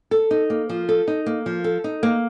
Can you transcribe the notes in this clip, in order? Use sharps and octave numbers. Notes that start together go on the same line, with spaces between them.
A4
D#4
A#3
F3
A4
D#4
A#3
F3
A4
D#4
A#3